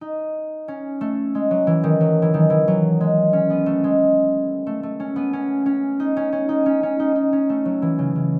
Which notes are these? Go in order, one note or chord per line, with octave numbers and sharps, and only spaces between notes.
D#4
C#4
A3
G#3
F#3
E3
D#3
F#3
E3
D#3
E3
F#3
G#3
C#4
B3
A3
G#3
A3
A3
C#4
B3
C#4
C#4
D#4
C#4
C#4
D#4
C#4
C#4
D#4
D#4
C#4
A3
F#3
E3
C#3
C#3